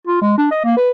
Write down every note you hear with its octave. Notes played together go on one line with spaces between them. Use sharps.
F4
G#3
D4
D#5
A#3
B4